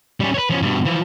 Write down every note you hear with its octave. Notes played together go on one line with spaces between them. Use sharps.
G3 C#4
B4 C#5
F3 C#4
G2 B2
E3 F3